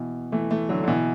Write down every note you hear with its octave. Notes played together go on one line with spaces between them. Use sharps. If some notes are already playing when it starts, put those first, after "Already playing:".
Already playing: B2 E3
E3 A3
E3 A3
D3 F#3
D3
B2 E3